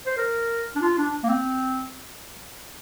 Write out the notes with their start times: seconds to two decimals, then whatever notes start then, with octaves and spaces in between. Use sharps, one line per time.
0.06 C5
0.17 A#4
0.76 D4
0.82 F4
0.98 D4
1.24 A#3
1.29 C4